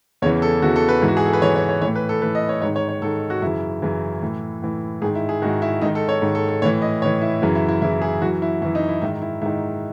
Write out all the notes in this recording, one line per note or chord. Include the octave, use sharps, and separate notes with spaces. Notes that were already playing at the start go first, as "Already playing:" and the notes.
E2 C#3 E3 C#5
A4
E2 C#3 E3 F#4
A4
B4
G#2 E3
F#4
G#4
A4
B4
G#2 E3 C#5
C#5
C#5
A2 E3 C#5
B4
A4
A2 E3 B4
D#5
C#5
G#2 D#3 C#5
C#5
C#5
G#2 D#3 A4
F#4
F#2 C#3 E3 E4
F#2 C#3 E3
A2 E3
A2 E3
G#2 D#3 G#4
E4
G#4
G#2 D#3 F#4
E4
G#2 D#3 D#4
A4
C#5
G#2 D#3
A4
A4
A2 E3 C#5
D#5
A2 E3 C#5
E4
F#2 C#3 E3
E4
E4
F#2 C#3 E3 E4
G#4
F#2 E3 F#4
E4
F#2 E3 E4
D#4
E4
G#2 D#3 E4
E4
G#2 D#3 E4